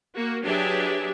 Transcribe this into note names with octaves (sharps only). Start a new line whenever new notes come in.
A#3 F#4
F#3 D4 G4 G#4 B4 E5